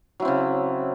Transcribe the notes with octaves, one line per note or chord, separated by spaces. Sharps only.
C#3 F#3 C4 E4